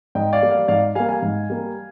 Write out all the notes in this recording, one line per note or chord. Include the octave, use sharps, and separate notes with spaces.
G#2 D#5 G5
D5 F5
G3 A#3
D5 F5
G#2 D5 F5
G3 A#3 F5 G#5
F5 G#5
G#2
G3 A#3